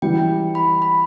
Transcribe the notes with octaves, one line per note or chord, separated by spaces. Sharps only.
E3 G3 E4 G5
B5
B5